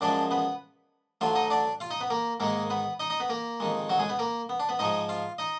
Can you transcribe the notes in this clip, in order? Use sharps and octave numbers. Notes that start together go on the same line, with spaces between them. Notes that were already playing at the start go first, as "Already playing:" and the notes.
F#2 F3 G#3 D4 D5
B3 B4
D2 D3 F#3 F4 F5
D#4 D#5
D4 D5
F4 F5
D#4 D#5
B3 B4
A#3 A#4
G#2 D#3 G#3 A#3 A#4
B3 B4
D#4 D#5
D#4 D#5
B3 B4
A#3 A#4
F2 D#3 G#3
F#3 F#4
G#3 G#4
B3 B4
A#3 A#4
B3
D4
B3 B4
G#2 F3 G#3 D#4 D#5
F4 F5
D#4 D#5